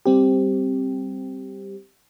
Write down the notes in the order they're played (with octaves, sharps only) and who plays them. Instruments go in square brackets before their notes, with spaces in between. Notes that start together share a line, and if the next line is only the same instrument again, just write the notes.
[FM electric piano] G3 C4 G4